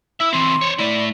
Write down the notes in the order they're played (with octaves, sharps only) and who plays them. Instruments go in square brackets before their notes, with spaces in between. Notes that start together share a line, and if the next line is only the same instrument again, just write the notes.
[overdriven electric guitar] E4 E5 [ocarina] E6
[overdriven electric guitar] E3 C4 [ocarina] C6
[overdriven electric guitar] C5 C#5
[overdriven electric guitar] A3 E4 [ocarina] D5